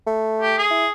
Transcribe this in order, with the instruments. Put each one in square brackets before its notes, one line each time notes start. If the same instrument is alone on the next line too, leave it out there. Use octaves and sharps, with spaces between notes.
[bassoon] A3
[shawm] G4
G#4
[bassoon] E4